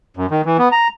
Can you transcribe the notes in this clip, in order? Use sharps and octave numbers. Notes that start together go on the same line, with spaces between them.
F#2
D#3
E3
B3
A#5